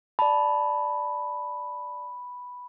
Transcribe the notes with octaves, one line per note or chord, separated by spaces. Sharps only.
D5 A5 B5